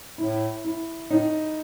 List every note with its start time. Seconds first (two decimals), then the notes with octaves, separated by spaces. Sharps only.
0.18 A2 E4
0.64 E4
1.10 A2 D#4